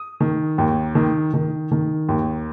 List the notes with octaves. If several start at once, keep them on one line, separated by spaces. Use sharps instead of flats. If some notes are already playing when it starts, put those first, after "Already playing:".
Already playing: D#6
D#3
D#2
D#3
D#3
D#3
D#2